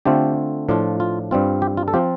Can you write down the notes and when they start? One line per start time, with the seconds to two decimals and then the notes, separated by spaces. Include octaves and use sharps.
0.05 D3 A3 C4 F4 G4
0.69 A2 F3 D4 F4
1.00 F4
1.31 G2 G3 C4 F4
1.62 G4
1.77 F4
1.88 A4
1.94 F3 C4 F4 G4